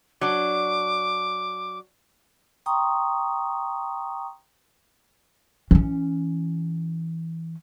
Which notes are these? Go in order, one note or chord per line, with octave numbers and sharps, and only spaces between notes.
F#3 D4 D6
G5 A#5 C6 C#6 D#6
E3 C#4